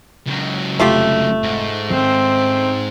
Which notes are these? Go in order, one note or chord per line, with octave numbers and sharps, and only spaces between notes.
C#2 F#3
F1 A3 F4 G4
G#2
D#3 C4 C#4